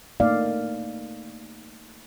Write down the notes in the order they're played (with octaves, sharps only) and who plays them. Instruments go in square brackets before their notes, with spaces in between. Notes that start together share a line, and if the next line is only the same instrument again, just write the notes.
[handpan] A3 A#3 D#4 D5 F5